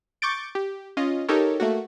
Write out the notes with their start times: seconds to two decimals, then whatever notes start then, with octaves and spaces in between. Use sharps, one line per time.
0.22 C#6 D6 G6 A6 D7
0.55 G4
0.97 C#4 F4 D#5
1.29 D#4 G4 A4 A#4 C#5
1.60 A3 A#3 F#4